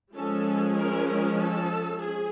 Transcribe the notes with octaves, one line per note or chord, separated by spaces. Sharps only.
F3 G#3 C#4 A4
A#4
A#4
A4
G#4